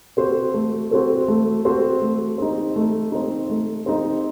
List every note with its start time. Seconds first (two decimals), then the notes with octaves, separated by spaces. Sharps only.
0.17 C4 F#4 A4 C5
0.54 A3
0.91 C4 F#4 A4 C5
1.28 A3
1.65 C4 F#4 A4 C5
2.02 A3
2.38 C4 D#4
2.76 A3
3.12 C4 D#4
3.50 A3
3.86 C4 D#4